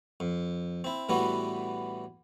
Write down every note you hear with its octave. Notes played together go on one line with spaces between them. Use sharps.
F2
C4 E4
A2 E3 G3 B3 E4 F#4